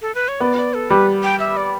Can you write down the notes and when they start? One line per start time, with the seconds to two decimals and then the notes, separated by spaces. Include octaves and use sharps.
0.02 A4
0.15 B4
0.28 C#5
0.40 B3 D5
0.57 D5
0.74 A4
0.90 G3 B4
1.23 G5
1.40 E5
1.57 D5